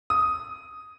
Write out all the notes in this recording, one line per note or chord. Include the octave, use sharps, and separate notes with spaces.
D#6